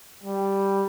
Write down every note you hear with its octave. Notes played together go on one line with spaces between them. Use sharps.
G3